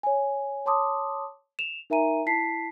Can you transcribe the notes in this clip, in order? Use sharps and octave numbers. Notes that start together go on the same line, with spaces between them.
C#5 G#5
C#5 A5 C6 D6 D#6
E7 F7
D#4 A#4 E5 G#5 A#5 D#7
E4 A5 B6 C7